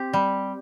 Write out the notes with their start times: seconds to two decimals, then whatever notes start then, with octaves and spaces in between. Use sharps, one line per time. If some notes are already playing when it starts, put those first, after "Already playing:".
Already playing: C4 G4
0.13 G3